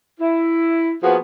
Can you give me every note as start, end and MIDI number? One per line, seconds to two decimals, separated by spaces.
0.20 0.92 64
1.02 1.18 53
1.02 1.18 58
1.02 1.18 59
1.02 1.18 66
1.02 1.18 68